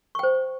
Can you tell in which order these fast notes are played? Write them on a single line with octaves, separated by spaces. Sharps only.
C#6 G5 C5